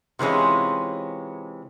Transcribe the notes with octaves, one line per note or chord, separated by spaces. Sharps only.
C3 E3 G#3 C#4 F4